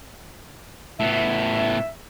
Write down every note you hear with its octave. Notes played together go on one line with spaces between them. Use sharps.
A2 B3 E5